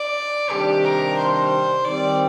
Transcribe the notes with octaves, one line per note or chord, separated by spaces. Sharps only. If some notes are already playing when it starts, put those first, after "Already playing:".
Already playing: D5
C3 D#3 G3 D4 G4
A#4
C5
D#3 G3 C4 D5